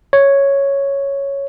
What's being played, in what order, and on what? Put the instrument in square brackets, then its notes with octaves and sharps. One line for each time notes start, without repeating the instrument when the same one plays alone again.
[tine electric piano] C#5